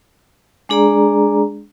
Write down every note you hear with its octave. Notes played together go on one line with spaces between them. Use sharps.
G#3 D4 G#4 D5 A#5